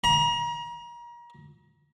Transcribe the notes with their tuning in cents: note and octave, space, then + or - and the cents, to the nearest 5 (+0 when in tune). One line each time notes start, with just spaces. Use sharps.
A#5 +35